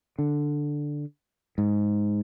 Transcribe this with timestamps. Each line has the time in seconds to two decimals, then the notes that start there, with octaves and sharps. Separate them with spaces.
0.19 D3
1.58 G#2